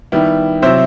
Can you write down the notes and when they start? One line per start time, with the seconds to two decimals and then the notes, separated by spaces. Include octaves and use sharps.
0.12 D#3 G3 B3 E4
0.62 C3 F#3 C4 E4 C5 E5